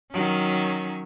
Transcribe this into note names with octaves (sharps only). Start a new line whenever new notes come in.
D#3 F#3 C#4